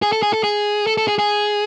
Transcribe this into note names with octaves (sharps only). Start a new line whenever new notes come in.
G#4
A4
G#4
A4
G#4
A4
A4
G#4
G#4